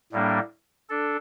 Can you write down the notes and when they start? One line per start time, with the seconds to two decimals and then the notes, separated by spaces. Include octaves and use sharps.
0.12 A2 G3 A#3 D4
0.89 D4 A4